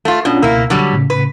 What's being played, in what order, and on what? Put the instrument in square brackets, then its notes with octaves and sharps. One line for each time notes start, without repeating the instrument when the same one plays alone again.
[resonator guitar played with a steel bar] A3 F4
[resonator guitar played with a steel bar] B2 [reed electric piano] C#4 D4 F4
[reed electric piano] C#2 B2 E6 [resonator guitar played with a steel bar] A#3 E4
[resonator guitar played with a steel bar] D3 F#3 G3
[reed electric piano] A2 C#3
[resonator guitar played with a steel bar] B4